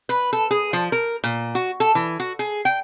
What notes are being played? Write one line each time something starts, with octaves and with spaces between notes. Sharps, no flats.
B4
A4
G#4
F3
A#4
A#2
F#4
A4
E3
F#4
G#4
G5